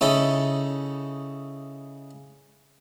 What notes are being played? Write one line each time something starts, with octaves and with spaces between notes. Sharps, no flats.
C#3 C#4 D#4 E4 A4